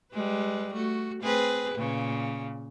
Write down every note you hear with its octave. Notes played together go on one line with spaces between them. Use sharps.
G3 G#3 B4
A3 F#4
C4 G#4 B4
A#2 C#3